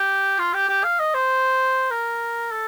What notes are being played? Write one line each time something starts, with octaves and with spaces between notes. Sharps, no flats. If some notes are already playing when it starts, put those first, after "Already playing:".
Already playing: G4
F4
G4
G4
F5
D#5
C5
A#4
A4